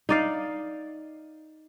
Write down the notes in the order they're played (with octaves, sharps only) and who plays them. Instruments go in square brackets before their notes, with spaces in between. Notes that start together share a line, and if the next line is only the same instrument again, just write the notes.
[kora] D#4 D5 F5